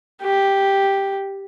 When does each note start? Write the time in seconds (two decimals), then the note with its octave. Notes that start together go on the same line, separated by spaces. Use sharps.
0.22 G4